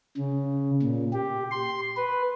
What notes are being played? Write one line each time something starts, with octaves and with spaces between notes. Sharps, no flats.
C#3
A#2
G4
C6
B4